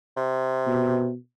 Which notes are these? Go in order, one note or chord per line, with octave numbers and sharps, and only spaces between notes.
C3
B2